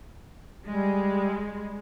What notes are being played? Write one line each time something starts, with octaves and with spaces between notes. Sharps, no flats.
G3 G#3